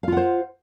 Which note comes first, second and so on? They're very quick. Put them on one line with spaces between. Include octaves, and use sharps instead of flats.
F5 F4 F#5 C5